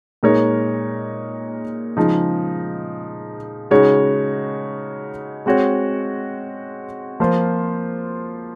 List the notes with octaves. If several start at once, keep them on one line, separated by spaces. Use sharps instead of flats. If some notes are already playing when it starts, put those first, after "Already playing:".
A#2 G#3 D#4 A#4 C#5
C#3 F3 G#3 D#4
C#3 G#3 D#4 F#4 C#5
G#3 C4 F#4 C#5
F3 A#3 F4 C5